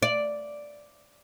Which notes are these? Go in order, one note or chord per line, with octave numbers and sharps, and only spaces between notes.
D5